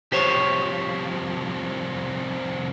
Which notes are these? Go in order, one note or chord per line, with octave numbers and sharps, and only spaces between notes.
C2 F3 G4 C5 C#5